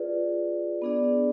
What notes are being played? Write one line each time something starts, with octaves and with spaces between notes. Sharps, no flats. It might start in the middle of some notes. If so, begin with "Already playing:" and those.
Already playing: F4 G#4 B4 D5
B3 D4 G#4 D5